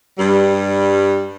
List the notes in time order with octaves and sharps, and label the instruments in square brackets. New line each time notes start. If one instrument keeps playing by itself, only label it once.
[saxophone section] G2 G3